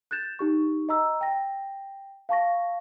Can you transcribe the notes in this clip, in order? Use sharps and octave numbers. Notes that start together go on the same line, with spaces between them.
F#6 G6 A6 E7
D#4 G4 C#6
D#5 A#5 E6
G5 A#6
F5 A5 C#6 A#6